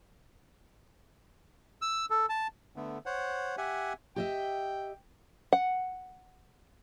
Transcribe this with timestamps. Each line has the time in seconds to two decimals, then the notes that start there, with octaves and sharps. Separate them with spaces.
1.82 E6
2.10 A4
2.29 A5
2.76 D3 A3 B3
3.06 C5 C#5 F#5
3.58 G4 E5 F#5 G#5
4.16 G4 D#5 E5 G5
5.53 F#5